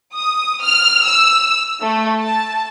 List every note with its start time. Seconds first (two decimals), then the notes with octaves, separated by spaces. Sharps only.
0.15 D#6
0.64 F6
1.05 E6
1.83 A3
2.21 A5